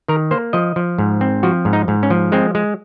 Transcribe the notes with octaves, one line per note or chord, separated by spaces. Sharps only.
D#3 A#4
A#3 C5
F3 D#5
F3
G#2
C4
F3 F#4
G#2
D#4
G#2
C#4
F3
G#3 C4
G#3